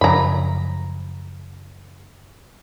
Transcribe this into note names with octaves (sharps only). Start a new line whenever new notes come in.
F#2 C#3 F3 A#5 B5